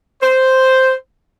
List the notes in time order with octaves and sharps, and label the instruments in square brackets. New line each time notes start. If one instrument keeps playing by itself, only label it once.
[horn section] C5